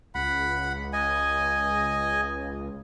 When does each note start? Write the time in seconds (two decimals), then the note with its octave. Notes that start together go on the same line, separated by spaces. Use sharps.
0.15 C#2 F#5 B5
0.93 D#5 G#5